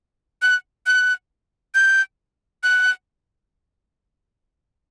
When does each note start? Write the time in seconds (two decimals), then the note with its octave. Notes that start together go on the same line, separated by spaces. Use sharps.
0.42 F#6
0.87 F#6
1.75 G6
2.63 F#6